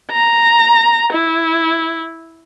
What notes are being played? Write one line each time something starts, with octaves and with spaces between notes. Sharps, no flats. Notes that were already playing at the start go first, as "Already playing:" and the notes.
A#5
E4